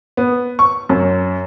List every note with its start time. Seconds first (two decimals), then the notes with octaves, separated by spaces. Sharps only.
0.17 B3
0.59 C#6
0.89 F#2